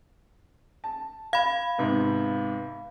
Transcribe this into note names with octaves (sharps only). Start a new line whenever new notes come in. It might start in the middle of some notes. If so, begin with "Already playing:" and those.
A5
F5 B5 G#6
G#2 C3 B3